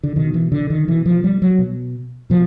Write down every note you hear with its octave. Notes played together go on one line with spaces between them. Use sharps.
D3
B2 D#3
E3
D3
D#3
B2 E3
F3
G3
F#3
B2
B2 F3